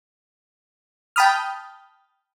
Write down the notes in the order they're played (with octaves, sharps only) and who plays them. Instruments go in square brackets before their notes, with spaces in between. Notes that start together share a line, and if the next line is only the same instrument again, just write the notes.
[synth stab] G5 A5 B5 D#6 F6